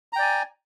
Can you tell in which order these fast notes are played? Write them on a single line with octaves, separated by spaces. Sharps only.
A#5 G5 D5 G#5